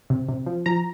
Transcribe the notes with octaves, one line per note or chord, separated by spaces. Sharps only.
C3
C3
F3
F3 A#5